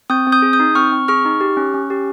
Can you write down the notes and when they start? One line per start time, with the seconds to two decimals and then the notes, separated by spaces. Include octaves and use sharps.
0.10 C4 D#6 G6
0.27 C4
0.32 D#6 G6
0.42 G#4
0.53 D#6 G6
0.60 D#4
0.75 C4 C#6 F6
0.92 C4
1.08 G#4 C#6 F6
1.25 D#4
1.41 G4
1.57 C#4
1.74 C#4
1.90 G4